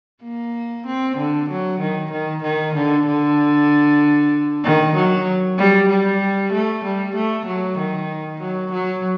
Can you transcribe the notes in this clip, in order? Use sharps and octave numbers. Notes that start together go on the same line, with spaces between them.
A#3
C4
D3
F#3
D#3
D#3
D#3
D3
D3
D#3
F#3
G3
G3
A3
G3
A3
F#3
D#3
F#3
F#3